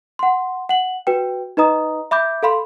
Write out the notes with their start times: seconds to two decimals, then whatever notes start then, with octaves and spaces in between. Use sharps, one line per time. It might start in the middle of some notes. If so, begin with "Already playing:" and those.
0.19 F#5 C6
0.69 F#5 F#7
1.07 F#4 B4 G5
1.57 D#4 B4 D#5 A#5 D#6
2.11 E5 B5 D6 G6
2.43 A4 F5 B5 C6